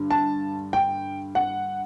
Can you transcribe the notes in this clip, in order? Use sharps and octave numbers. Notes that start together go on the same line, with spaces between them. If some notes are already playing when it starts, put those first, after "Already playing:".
Already playing: G2 D3
A5
G5
F#5